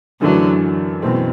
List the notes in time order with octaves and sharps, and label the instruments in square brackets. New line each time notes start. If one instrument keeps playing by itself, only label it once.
[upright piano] F#2 E3 A3 D4 [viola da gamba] D3 F#3
[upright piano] F#2 E3 A3 C4 [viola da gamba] B2